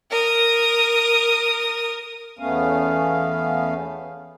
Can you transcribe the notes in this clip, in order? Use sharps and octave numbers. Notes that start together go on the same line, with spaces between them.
A#4 D#6
E2 A3 B3 C#4 F5